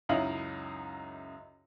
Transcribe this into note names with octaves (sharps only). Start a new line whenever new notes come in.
C#2 F#2 D#4 E4 F5 F#7